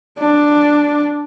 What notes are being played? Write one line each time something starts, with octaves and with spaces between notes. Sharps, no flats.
D4